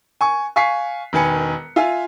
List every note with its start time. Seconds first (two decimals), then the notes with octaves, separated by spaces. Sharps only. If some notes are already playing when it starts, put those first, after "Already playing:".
0.21 G#5 C#6
0.56 F5 G#5 C#6 B6 C7
1.13 E1 D#3 B4 G#5 C#7
1.76 F4 E5 F5 G#5